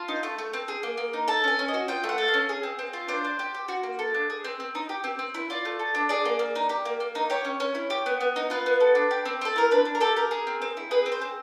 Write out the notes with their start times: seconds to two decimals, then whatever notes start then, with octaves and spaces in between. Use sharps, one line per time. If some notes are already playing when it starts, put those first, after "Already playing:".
Already playing: F4 A5
0.08 D#4
0.23 A3
0.39 A3
0.53 C4
0.68 G#4
0.83 A#3
0.98 A#3
1.13 D#4
1.28 A4 A5
1.44 C#4 G#5
1.59 C#4
1.68 D#5
1.74 F#4
1.88 F4 G5
2.04 A3
2.09 F#5
2.18 A4
2.28 F5
2.34 C#4
2.49 G#4
2.63 C4
2.79 C4
2.93 F4
3.08 D4 C5
3.24 D4
3.39 G4
3.55 G4
3.68 F#4
3.83 A#3
3.99 A4
4.14 D4
4.30 G#4
4.44 C4
4.60 C4
4.75 D#4
4.89 G4
5.04 C4
5.19 C4
5.34 E4
5.50 F4 D5
5.65 A3
5.79 A4
5.95 D4
6.09 G#4 D5
6.25 A#3
6.39 A#3
6.55 D#4
6.69 G4
6.85 A#3
7.00 A#3
7.15 D#4
7.30 G4 C#5
7.45 C#4
7.60 C#4
7.75 E4
7.90 G4
8.06 B3
8.21 B3
8.36 D#4
8.50 F4 B4
8.66 B3
8.80 A4
8.95 D4
9.11 G4
9.25 C4
9.41 C4 A4
9.56 E4 A#4
9.71 D4 B4
9.85 D4
9.95 A#4
10.00 G4 A4
10.16 G4 A#4
10.31 G#4
10.47 C4
10.62 C4
10.77 E4
10.91 G#4 B4
11.06 C4
11.12 C5
11.21 C4